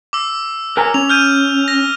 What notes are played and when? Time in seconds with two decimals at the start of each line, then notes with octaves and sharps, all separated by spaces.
0.13 D6 E6
0.77 A#4 G#5 A#5
0.94 C#4 F7
1.09 F6 G6 D#7
1.68 A#6